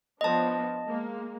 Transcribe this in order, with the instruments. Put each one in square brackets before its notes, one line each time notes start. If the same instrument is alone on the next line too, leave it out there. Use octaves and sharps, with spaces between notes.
[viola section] F3 B3 D4 [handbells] D#5 A5
[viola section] G#3 A#3